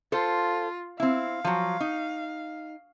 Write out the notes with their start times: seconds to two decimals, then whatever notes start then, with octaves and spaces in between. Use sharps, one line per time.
0.12 F4 A4 C5
1.00 C4 E4 F5
1.44 F3 F#3
1.80 D#4